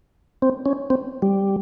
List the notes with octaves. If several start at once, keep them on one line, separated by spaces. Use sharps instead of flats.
C4
C#4
C4
G3